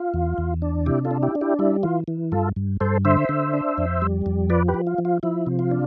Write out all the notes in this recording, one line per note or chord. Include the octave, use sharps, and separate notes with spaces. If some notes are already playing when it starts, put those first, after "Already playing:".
Already playing: F4
E2
E2
D4
C3 E4 G4
F4 A4
D4
E4 G4
D4
E4 G4
G3 E4
E3 F4
E3
G2 F4 A4
G2
G2 A4 C5
D3 C5 E5
D3
D4
F2
G3
F2
F3 B4 D5
G4 B4
F3
F4
F3
F4
F3 E4
C3
F4
D4